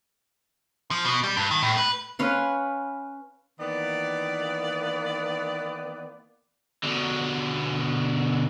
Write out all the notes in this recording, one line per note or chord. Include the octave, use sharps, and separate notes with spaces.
F3
B2
G3
G2
D#3
A2
B4
C#4 B4 F5 C6
D#3 E3 A#3 B3 B4 D5
B2 D3